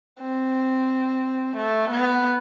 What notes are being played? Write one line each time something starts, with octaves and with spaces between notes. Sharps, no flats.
C4
A3
B3